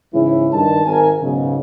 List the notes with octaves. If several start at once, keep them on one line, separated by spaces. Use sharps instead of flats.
G#2 C#3 E3 C#4 E4
G2 D#3 A5
G#1 A#4 G#5
B1 G#2 C#3